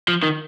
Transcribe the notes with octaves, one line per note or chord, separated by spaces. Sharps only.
F3
D#3